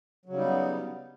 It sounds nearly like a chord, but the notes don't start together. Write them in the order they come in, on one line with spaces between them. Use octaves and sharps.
F#3 C#3 G3 D#4 B3